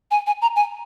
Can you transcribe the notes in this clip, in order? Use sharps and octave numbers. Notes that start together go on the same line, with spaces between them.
G#5
G#5
A#5
G#5